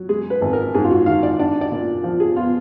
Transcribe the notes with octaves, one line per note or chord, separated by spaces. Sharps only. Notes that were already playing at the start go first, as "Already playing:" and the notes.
Already playing: F#3
G#3 G#4
B4
G#1
A#4
G#2 G#4
F4
F#4
D#3 F5
D5
D4 D5
D5
A#2
F3
G#4
B3 F4